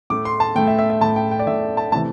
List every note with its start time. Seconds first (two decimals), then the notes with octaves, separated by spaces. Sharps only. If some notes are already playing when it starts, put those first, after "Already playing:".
0.10 A2 A3 D6
0.25 C6
0.40 A5
0.55 A2 A3 G5
0.67 E5
0.79 E5
0.90 E5
1.01 A2 A3 A5
1.16 G5
1.31 G5
1.39 D5
1.47 A2 A3 E5
1.77 A5
1.92 C3 E3 A3 A5